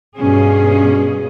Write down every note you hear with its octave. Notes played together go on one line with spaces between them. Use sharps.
G2 B2 C#4 G#4